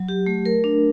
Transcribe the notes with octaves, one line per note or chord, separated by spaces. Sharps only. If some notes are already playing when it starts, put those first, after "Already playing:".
Already playing: F#3
G4
A3
A#4
D4